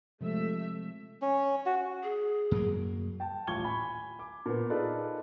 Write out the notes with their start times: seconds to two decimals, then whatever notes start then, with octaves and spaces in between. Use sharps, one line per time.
0.21 C3 F3 G#3 A3 E5
1.22 C#4
1.66 F#4
2.03 G#4
2.51 F#2 F#3 A#3
3.20 G5 A5
3.47 D#1 A1 F4 C#6 G#6 G7
3.64 G#5 B5
4.19 D6
4.46 A#2 B3
4.70 D#4 F4 G#4 A4 B4 D5